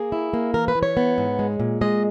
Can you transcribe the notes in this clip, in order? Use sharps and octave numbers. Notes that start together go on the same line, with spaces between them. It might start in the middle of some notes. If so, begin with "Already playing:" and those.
Already playing: A#3 G#4
E4
A#3
E3 A#4
B4
E3
C#5
B3
G#2
G#3
A#2
G#3 D#5